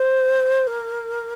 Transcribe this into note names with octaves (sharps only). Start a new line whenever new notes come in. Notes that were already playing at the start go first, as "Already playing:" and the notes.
Already playing: C5
A#4